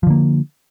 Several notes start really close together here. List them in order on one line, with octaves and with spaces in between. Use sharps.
F3 D3 A#3